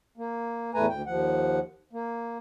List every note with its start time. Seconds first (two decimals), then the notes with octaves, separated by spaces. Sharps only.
0.18 A#3
0.74 E2 A2 A3 B4 G#5 A#5
0.89 D2 G5
1.06 D#2 F3 F#5
1.93 A#3